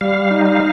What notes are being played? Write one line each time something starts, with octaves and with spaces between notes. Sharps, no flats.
G3 F5
D#4
F5